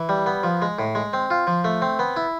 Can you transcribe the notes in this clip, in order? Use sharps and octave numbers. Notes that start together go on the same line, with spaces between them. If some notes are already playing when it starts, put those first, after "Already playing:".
Already playing: E3
G3
B3
F3
G#3
A2
G#3
C4
F4
F3
A3
C4
B3
E4